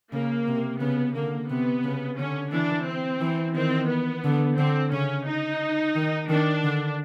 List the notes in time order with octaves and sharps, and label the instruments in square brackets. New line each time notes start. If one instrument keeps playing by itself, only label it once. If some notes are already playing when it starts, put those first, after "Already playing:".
[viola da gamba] C#3 [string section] A#3
[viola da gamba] C3
[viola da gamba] C#3 [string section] B3
[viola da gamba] D3 [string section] A#3
[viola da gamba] C3 [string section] B3
[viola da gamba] C#3
[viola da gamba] D3 [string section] C#4
[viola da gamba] E3 [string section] D4
[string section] C4
[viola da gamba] E3
[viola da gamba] D#3 [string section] C4
[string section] B3
[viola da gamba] D3
[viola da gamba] D3 [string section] C4
[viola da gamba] C#3 [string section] C#4
[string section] D#4
[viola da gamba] D#3
[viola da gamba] D#3 [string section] D4
[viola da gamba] D3